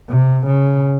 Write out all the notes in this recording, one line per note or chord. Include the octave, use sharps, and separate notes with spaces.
C3
C#3